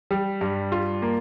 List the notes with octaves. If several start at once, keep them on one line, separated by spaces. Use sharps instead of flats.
G3
G2
F4
A#3